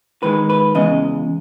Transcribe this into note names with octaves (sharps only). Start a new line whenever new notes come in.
G#2 D#3 G#3 B4
B4
E2 C#3 G#3 D#5